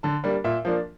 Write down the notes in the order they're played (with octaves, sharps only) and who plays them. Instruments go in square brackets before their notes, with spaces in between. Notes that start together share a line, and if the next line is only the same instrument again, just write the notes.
[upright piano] D3 A5
G3 A#3 D4
A#2 E5
F3 A#3 D4